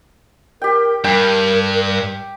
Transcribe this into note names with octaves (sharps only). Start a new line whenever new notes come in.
G4 A#4 G5
G2 A#4 G5